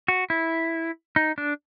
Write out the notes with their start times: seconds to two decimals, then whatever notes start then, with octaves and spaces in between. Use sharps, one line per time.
0.08 F#4
0.30 E4
1.16 D#4
1.38 D4